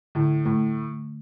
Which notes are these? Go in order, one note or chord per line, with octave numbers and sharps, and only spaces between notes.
A2 D3
A2 A3